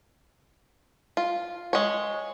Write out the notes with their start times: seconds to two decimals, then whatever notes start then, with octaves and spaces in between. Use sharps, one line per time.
1.17 F4
1.73 G#3 C#5